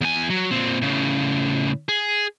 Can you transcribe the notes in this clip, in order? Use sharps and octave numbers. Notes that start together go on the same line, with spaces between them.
E2 G#5
F#3
A#2 C4
A2 C#3
G#4